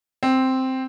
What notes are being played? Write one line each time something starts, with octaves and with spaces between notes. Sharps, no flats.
C4